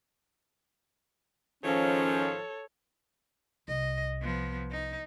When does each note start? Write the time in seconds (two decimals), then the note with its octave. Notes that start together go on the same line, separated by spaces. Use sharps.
1.64 G#2 D#3 F3 C#4 A4 C#5
3.68 C2 D#5
4.22 F3 B3
4.71 D#4